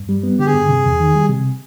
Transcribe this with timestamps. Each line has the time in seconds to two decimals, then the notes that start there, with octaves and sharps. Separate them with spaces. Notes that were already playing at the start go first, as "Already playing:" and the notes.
Already playing: G2
0.09 G3
0.23 B3
0.39 D3 G4
0.46 G#4
0.54 G2
0.69 C3
0.84 E2
1.00 D#3
1.15 G3
1.29 C3